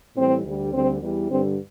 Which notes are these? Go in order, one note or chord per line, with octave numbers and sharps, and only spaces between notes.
A2 E3 G3 C4
D2 D3 G3
D2 D3 G3 C4
E2 E3 G3
G2 D3 G3 C4